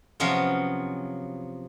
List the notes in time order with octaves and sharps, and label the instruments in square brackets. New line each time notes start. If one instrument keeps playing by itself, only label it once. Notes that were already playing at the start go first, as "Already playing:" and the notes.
[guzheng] C3 F3 F#3 B3 C#4 F4